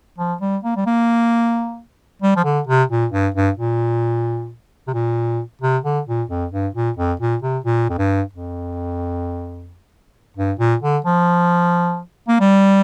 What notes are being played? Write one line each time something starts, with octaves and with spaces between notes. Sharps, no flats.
F3
G3
A#3
G3
A#3
G3
F3
D3
C3
A#2
G2
G2
A#2
C3
A#2
C3
D3
A#2
F2
G2
A#2
F2
A#2
C3
A#2
F2
G2
F2
G2
A#2
D3
F3
A#3
G3